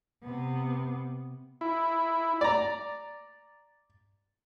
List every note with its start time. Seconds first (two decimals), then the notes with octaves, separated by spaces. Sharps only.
0.24 C3 B3
1.61 E4
2.41 D5 A#5